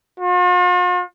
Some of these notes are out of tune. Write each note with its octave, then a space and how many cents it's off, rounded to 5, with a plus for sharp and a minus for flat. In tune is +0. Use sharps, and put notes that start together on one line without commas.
F4 +45